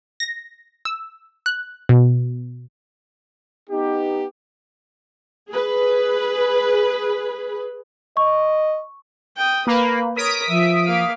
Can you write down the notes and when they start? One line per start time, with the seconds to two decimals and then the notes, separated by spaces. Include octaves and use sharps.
0.20 A#6
0.85 E6
1.46 F#6
1.89 B2
3.70 B3 D#4 G4
5.49 G#4 B4
8.17 D#5 C#6
9.37 G5 D#6
9.67 A#3 B4
10.16 A#4 C#5 D#6 B6 D7
10.48 F3 E5
10.86 A#3 F5